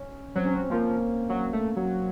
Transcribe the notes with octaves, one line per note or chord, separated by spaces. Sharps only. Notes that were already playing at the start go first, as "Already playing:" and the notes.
Already playing: C#4
F#3 C4
C#4
C4
F3 A#3
F#3
A3
F#3